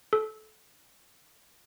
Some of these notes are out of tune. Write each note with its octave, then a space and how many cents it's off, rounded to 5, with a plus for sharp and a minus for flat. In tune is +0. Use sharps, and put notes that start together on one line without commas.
A4 -25